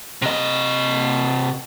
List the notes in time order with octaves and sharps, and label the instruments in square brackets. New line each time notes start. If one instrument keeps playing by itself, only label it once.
[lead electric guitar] C3 D#5